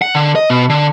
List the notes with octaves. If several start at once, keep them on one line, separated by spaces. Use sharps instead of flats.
F#5
D3
D#5
B2
D3